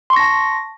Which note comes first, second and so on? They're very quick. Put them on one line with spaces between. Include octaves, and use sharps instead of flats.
C6 C#6 A#6 A5